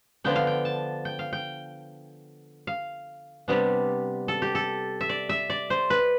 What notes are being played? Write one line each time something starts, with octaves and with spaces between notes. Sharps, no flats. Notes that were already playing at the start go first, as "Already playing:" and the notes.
D3 F3 B3 D4 G5
F5
G5
A5
G5
F5
G5
F5
C3 G3 B3 D4
A4
G4
A4
E5
D5
E5
D5
C5
B4